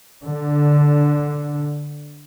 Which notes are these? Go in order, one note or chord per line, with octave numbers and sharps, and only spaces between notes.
D3